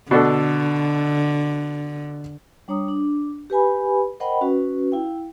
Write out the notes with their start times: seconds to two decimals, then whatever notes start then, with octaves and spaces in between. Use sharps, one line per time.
0.11 B2 D3 D4 A4
2.68 G3 D4 C#5 A#5 D#6
2.88 D4
3.50 G4 B4 G#5 B5
4.20 A#4 C5 D#5 F#5 G5 B5
4.41 C#4 F#4 B4
4.92 E4 F5 G5